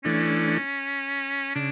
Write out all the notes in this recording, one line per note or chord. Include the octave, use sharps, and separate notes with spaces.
E3 A3 C#4 D4
C#3 D4